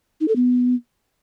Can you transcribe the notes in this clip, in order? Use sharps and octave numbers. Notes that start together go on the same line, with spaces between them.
D#4
A4
B3